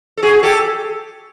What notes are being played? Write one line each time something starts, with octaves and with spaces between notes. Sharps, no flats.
A4
F#4 G#4
G#4
G4 A4